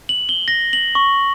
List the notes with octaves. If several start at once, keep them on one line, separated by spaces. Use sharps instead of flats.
F#7
G7
A#6
F#7
C#6